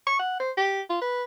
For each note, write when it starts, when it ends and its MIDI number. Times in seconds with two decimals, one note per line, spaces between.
0.07 0.16 85
0.19 0.39 78
0.40 0.51 72
0.57 0.81 67
0.90 0.99 65
1.01 1.24 71